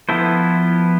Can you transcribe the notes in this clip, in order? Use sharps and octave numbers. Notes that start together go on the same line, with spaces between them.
F3 B3 E4 A4 C5